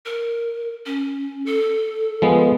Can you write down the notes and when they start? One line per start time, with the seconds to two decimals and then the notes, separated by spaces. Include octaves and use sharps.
0.06 A#4
0.86 C#4
1.46 A4
2.22 F3 G#3 B3